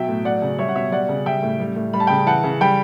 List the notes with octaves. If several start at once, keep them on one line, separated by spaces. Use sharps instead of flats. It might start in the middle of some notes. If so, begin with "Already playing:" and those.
Already playing: B2 F#3 E5 G5
A2
F#3 D5 F#5
C#3
G3 C#5 E5
F#5
B2 C#5 E5
G3 D5 F#5
C#3
G3 E5 G5
A2
G3
A2
G3 B5
A5
C#3 G5 B5
E3 F#5 A5
C#3
G3 G5 B5